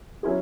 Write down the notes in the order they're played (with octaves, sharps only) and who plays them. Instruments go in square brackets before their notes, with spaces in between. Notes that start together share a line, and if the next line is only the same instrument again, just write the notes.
[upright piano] F#3 C#4 E4 G#4